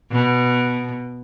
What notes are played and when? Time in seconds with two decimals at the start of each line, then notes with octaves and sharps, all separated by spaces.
0.12 B2